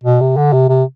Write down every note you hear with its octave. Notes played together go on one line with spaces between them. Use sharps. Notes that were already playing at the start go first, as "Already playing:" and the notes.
B2
C3
D3
C3
C3